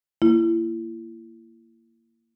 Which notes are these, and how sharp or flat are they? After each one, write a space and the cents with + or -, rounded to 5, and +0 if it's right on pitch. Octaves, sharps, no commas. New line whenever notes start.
A#3 -20 E4 +30